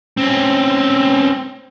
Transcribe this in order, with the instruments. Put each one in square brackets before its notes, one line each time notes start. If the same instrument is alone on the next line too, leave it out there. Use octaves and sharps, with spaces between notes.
[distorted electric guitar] C4 C#4